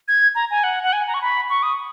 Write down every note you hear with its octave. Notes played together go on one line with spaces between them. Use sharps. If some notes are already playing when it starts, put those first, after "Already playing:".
G#6
A#5
G#5
F#5
F#5
G#5
A#5
C#6
B5
C#6
D#6